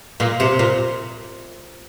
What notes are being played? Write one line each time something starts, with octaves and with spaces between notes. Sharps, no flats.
A#2
C3
A#2